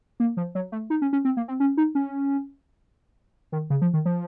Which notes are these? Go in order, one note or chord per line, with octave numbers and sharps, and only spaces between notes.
A#3
F3
F#3
A3
D#4
C#4
C#4
C4
A#3
C4
C#4
D#4
C#4
D#3
C#3
F3
D#3
F3